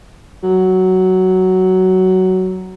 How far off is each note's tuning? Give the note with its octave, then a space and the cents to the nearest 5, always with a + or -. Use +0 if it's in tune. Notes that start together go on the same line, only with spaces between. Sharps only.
F#3 +10